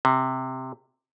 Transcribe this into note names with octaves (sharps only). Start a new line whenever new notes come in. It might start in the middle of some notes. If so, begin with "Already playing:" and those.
C3